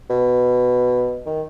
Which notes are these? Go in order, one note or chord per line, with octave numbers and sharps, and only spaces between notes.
B2
D#3